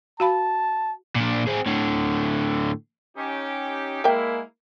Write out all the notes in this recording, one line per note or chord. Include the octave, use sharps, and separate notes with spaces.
F#4 F5 A5 B5
A#2 D4
C4 G#4
A2 D3
C#4 D#4 G4
G#3 A#3 E4 A#4 E5 G5